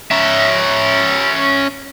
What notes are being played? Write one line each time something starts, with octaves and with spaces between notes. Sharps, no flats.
C#4 E5